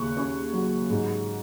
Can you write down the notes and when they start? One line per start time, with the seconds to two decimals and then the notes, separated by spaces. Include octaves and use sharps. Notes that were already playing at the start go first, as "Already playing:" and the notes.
Already playing: D#2 C#3 C#6 F#6
0.17 C#4 C#6
0.53 F#3
0.90 G#2